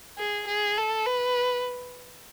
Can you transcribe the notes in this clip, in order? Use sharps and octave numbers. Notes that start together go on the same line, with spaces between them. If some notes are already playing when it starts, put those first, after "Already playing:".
G#4
G#4
A4
B4